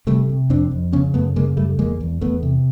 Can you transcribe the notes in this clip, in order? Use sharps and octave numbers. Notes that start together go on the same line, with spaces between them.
C3 G3 A3
C3
F2 C4 D4
F2
C#3 B3 C#4
F#2 A3 B3
C#3 G#3 A#3
F#2 G3 A3
E2 G#3 A#3
E2
E2 A3 B3
C3